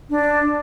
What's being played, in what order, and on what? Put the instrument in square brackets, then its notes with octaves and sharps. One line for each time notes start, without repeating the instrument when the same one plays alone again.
[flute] D4